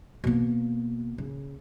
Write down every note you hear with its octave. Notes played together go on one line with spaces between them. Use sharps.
B2 A#3
C#3